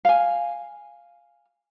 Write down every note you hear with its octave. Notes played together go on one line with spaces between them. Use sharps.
F5 G#5